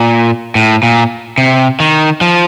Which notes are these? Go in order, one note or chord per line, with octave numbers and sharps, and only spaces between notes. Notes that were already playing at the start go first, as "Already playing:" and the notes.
Already playing: A#2
A2
A#2
C3
D#3
F3